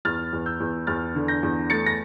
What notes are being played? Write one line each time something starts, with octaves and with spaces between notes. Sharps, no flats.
E2 F6 A6
E2
E6 G6
E2
E2 F6 A6
D3
G6 A#6
E2
A3 A6 C#7
A#6